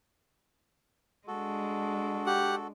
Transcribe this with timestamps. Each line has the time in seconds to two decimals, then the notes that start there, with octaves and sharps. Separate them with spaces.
1.28 G#3 D4 F#4 A4
2.26 G4 F#5